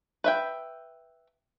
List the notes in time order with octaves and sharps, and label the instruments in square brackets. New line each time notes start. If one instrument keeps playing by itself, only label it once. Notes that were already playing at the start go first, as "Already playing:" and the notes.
[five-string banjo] B4 E5 G5